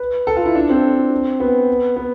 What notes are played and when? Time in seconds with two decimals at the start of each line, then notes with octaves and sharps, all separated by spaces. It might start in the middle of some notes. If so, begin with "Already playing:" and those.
Already playing: B4
0.27 A4
0.36 F4
0.46 E4
0.55 D4
0.69 C4
1.40 B3
1.96 B3